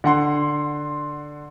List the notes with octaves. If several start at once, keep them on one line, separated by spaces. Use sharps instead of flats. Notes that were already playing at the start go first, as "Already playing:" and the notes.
D3 F#5 C6